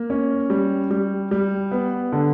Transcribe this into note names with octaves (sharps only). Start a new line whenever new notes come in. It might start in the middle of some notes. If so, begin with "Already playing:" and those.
Already playing: A#3
C#4
G3
G3
G3
B3
D3